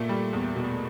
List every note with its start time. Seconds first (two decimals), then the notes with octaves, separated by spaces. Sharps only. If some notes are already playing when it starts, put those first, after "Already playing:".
Already playing: A#2 A3
0.09 G3
0.33 E2
0.56 B2